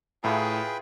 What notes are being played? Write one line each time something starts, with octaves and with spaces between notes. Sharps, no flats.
A2 E4 F4 G#4 B4 G5 A#5